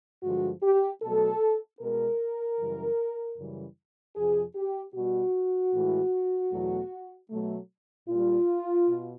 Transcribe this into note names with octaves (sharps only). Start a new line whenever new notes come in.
G2 D3 F3 G#3 F#4
G4
B2 F#3 A3 A4
B2 G#3 A#4
F#2 C#3 E3 G3
F#2 C#3 E3 G3
F2 C3 F3 G#4
G4
B2 G3 F#4
A2 E3 G#3
E2 B2 F#3 A3
B2 F#3 A3
A#2 G3 F4
B2